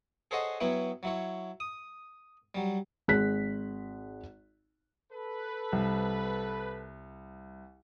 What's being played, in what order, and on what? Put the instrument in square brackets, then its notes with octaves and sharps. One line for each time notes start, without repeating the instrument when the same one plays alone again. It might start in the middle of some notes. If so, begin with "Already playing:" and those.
[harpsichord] G#4 A4 C5 C#5 D#5 F#5
F#3 B3 E4 C#5 G5
F#3 E4 C#5
D#6
F#3 G3
[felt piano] G#1 G#4 F#6 B6
[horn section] A4 B4
[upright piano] C2